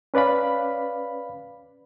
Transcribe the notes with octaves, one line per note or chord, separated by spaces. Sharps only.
C#4 B4 D5 F5 B5